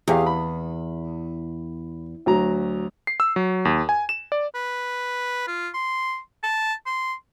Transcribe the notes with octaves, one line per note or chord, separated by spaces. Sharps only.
E2 G4 G#4 F5
B5
D2 F#3 A#5
C7
E6
F#3
D#2
G#5
E7
D5
B4
F4
C6
A5
C6